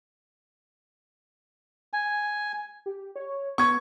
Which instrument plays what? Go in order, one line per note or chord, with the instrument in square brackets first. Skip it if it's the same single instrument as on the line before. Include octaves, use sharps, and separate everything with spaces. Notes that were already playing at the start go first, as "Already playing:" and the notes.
[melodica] G#5
[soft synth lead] G4
C#5
[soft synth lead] B3 [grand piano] C#6 G#6